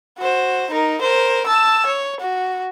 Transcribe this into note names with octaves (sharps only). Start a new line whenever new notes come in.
F#4 C5
D#4 A#4
A#4 C5
A5 E6
C#5
F#4